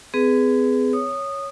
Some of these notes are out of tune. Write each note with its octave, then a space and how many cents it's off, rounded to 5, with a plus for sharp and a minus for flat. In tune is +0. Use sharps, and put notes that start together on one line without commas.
C4 -45 G#4 +0 B4 +0
C#5 +0 D#6 -15